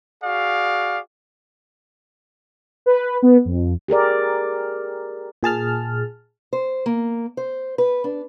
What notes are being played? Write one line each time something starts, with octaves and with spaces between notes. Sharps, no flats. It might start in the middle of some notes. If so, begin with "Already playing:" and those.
F#4 G#4 D5 F5
B4
B3
F2
G4 G#4 A#4 D5
A#2 G#4 A5 F6
C5
A#3
C5
B4
D4